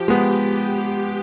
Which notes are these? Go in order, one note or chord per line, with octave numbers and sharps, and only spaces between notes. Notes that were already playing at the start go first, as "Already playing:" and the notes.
Already playing: F3 G4
G#3 B3